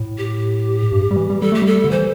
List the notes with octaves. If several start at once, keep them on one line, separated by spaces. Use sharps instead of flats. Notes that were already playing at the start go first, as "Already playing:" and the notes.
Already playing: A2
G4
G2
G3
E3
G3
G3 A4
A3 G4
G3 A4
D3
E3 C5